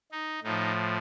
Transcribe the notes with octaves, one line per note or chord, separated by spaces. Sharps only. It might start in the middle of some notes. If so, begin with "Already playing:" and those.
D#4
A2 F3 D#4